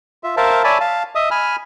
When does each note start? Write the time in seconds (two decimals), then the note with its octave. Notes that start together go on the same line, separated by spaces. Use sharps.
0.24 F4 E5
0.37 A#4 C5 E5 F5 A5
0.64 C#5 D5 E5 G#5 A5 B5
0.80 F5 A5
1.15 D#5 E5 D#6
1.31 G#5 B5 F6